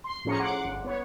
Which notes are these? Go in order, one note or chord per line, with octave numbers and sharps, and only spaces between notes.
C6
A2 F3 C#4 G#4 A#5 C#7
F#5 C6 D6
G1
B3 C#5